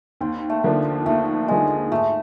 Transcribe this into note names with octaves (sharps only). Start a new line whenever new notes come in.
D#2 C4
A3
D3 F3 A#3 D4
D#2 A3
D3 F3 G#3 A#3 D4
G#1 A3